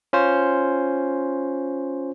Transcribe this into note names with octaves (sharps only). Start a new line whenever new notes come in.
C#4 F4 C5